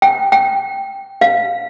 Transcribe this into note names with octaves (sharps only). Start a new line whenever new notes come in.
G5
G5
F5